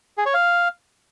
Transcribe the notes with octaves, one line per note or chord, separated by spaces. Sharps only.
G#4
C#5
F5